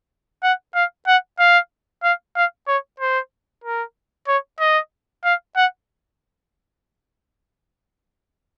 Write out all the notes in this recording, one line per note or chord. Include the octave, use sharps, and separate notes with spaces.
F#5
F5
F#5
F5
F5
F5
C#5
C5
A#4
C#5
D#5
F5
F#5